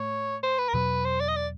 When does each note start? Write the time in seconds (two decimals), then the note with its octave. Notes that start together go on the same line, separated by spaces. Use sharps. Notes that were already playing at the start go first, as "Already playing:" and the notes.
Already playing: A2 A3 C#5
0.43 C5
0.59 B4
0.69 A#4
0.74 E2 B2 F#3 B4
1.05 C5
1.20 D5
1.29 D#5
1.36 D5